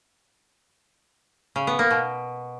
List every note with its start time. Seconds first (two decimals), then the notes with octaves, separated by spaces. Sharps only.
1.56 C#3
1.67 B3
1.79 A#3
1.91 B2